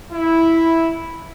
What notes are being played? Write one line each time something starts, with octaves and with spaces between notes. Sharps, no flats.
E4